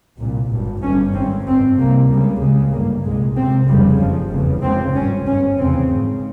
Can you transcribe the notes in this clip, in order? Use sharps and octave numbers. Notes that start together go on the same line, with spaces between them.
C2 A#2
G#1 G2
G1 G2 C#4
G#1 G2 C4
G1 G2 C4
C2 C3 A#3
C#2 C#3 G3
C#2 C#3 G#3
G1 G2 A#3
C2 A#2 G#3
C#2 C3 C4
F1 F2 C#3 G3
G1 G2 F3
F1 E2 C#3
C#2 C#3 C4
G#1 G2 C#4
G1 G2 C#4
F1 E2 C#3 C4
G#1 G#2